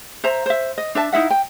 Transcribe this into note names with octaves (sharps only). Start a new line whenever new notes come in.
C5 E5 A#5
C5 E5
D#5
D4 E5 A5
D#4 E4 E5 F#5
G5